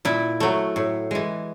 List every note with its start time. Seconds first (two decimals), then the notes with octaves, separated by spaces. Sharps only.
0.05 A#2 E4
0.40 F#3 A3
0.76 A2
1.11 E3 G#3